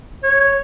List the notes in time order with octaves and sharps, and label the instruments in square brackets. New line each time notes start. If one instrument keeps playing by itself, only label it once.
[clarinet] C#5